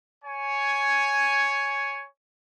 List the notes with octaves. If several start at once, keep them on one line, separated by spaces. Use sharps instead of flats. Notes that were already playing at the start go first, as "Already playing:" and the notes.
C#5 G#5